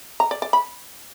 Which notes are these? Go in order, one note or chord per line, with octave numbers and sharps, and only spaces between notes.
A#5
D5
D5
B5